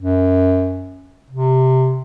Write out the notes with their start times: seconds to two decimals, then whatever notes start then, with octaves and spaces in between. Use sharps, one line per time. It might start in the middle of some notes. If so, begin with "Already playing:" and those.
0.01 F#2
1.30 C3